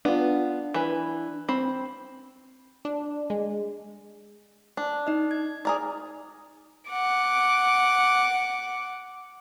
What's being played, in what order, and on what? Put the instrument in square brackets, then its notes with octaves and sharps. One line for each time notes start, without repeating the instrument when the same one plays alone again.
[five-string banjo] B3 F4 [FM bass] D4
[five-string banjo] E3 B4
C4 B5
[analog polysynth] D4
G#3
[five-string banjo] D4
[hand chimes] D#4 D#5
G#6
[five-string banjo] G#4 A#4 D5
[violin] F#5 D6